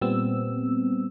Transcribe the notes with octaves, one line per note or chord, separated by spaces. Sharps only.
A#2 G3 B3 C4 E6